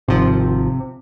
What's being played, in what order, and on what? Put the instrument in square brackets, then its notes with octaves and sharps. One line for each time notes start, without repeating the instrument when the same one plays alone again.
[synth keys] G#1 F3 [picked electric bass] C3